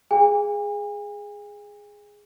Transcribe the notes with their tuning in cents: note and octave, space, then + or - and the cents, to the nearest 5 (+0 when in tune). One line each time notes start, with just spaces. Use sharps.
G#4 +0 F5 +0 G#5 -45